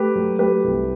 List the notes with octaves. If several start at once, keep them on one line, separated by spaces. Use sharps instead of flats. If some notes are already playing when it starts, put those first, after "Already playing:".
Already playing: A3 G4 B4
F#3
A3 G4 B4
C2